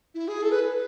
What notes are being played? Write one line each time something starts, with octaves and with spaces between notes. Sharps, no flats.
E4
G#4
A4
B4